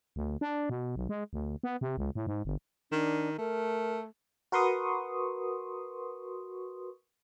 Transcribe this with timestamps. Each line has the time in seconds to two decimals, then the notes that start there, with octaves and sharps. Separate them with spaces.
0.16 D2
0.41 D4
0.69 B2
0.96 B1
1.09 G#3
1.33 D2
1.63 B3
1.81 C3
1.97 C#2
2.15 A2
2.27 G#2
2.45 G1
2.92 D#3 D4
3.38 A3 A#4
4.52 F#4 A#4 B4 C6 C#6 D#6